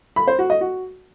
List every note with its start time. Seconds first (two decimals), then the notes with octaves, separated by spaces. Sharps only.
0.16 B5
0.28 C5
0.39 F#4
0.50 D#5
0.61 F#4